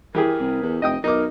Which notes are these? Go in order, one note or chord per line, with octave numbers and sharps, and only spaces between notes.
E3 G4 G#4 A#4
C2
E2
F1 D#5 G5 D#6
B1 D#4 A#4 D6